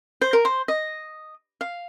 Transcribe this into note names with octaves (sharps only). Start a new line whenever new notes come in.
C5
A#4
C5
D#5
F5